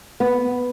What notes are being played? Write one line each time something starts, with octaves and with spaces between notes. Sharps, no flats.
B3